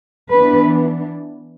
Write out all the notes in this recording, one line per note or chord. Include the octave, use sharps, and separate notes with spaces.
E3 B3 D4 B4